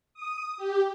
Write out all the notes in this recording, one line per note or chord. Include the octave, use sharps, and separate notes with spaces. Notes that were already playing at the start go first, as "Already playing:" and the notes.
D#6
G4